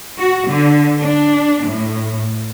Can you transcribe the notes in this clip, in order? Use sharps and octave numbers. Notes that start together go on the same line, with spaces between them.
F#4
D3
D4
A2